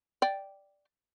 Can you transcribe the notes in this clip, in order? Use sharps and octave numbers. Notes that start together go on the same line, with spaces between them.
D5 G5